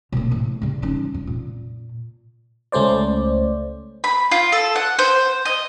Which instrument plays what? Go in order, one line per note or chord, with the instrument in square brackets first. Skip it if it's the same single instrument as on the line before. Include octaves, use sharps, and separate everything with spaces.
[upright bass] B2 A#3
A2 A#3
C#3 G3
C#4 D#4
F2
A#2
[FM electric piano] C#2 A3 C#4 C5 D5
[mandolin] B5
F4
A4
F#5
C5
D#5